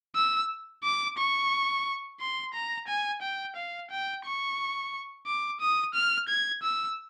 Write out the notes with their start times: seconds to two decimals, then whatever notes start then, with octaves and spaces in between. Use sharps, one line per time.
0.16 E6
0.84 D6
1.18 C#6
2.20 C6
2.54 A#5
2.88 G#5
3.22 G5
3.56 F5
3.90 G5
4.25 C#6
5.27 D6
5.60 D#6
5.94 F6
6.29 G#6
6.63 E6